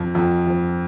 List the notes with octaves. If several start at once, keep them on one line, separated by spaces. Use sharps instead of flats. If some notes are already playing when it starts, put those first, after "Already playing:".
Already playing: F2 F3
F2
F3